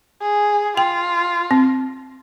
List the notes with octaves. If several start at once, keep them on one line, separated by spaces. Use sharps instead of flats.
G#4
F4 G5
C4